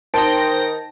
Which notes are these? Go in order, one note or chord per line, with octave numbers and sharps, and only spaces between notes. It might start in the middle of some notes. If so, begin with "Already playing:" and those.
D#3 D#4 C5 G5 A5 A#6 D7